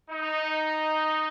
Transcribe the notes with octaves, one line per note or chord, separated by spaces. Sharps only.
D#4